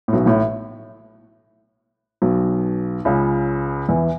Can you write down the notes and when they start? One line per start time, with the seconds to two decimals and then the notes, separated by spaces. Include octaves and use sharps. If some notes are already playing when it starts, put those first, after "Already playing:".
0.08 A2
0.13 B1 B2
0.26 A1 A2
2.22 B1 B2
3.05 C#2 C#3
3.88 E2 E3